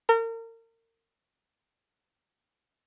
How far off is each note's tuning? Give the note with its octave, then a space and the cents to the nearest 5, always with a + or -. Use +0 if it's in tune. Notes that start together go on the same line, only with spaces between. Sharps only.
A#4 -35